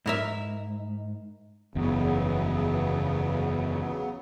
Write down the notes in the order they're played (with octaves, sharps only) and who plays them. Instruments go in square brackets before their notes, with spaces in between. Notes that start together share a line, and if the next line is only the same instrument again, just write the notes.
[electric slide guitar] G#2 [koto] E4 A#4 E5
[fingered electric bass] F#1 E2 [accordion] C#3 F#3 B3